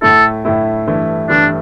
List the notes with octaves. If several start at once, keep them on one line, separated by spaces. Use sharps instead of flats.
A2 A3 E4 A4
A2 A3 E4
G2 E3 A3 E4
G2 E3 A3 D4 E4